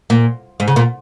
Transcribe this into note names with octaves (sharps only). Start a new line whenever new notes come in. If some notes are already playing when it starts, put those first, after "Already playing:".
A#2
G#2
C#3
A#2